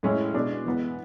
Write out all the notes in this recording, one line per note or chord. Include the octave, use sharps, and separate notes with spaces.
A2 G#3 C#4 E4
B2 G#3 D4
E3 G#3 B3